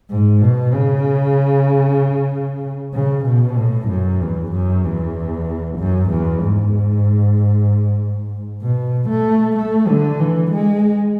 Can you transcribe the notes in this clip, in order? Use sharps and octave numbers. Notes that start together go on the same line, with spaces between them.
G#2
B2
C#3
C#3
B2
A2
F#2
E2
F#2
E2
F#2
E2
G#2
B2
A3
A3
D3
E3
G#3